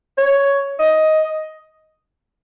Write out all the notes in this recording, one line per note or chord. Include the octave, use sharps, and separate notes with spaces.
C#5
D#5